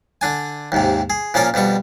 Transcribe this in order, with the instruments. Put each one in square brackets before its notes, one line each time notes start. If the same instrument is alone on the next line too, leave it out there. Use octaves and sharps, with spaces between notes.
[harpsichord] D3 D4 G#5
D#2 G#2 C3
G#4
A#2 F3 C#4 F4 A#4 C#5
F2 B2 G3 C#6